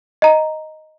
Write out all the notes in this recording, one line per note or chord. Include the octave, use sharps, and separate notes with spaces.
D#5 A#5